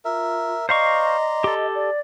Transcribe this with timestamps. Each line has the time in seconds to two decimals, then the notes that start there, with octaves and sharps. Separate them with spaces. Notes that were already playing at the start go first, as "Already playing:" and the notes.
0.05 F4 A#4 E5
0.69 C5 D5 D#5 F5 A#5 C6 C#6
1.44 G4 A4
1.74 D5